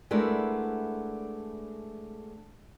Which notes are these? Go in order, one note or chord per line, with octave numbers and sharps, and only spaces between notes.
G#3 A3 B3 D4 E4 A#4